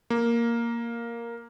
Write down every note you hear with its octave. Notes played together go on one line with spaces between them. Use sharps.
A#3